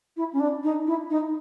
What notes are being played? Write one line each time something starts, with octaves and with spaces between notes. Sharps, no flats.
E4
C#4
D4
D#4
E4
D#4